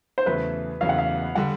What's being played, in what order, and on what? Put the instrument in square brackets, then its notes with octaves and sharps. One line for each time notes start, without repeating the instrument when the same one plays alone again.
[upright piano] C5
[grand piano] E2 C#3 F#3 A3 [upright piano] B4
[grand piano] E2 C#3 F#3 A3 [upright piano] F5
[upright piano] F#5
F5
[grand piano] D3 G3 [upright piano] F#5